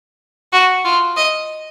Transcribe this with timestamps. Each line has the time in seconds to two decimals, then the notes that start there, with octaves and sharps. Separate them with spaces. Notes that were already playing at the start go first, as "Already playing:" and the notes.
0.53 F#4
0.85 F4
1.16 D#5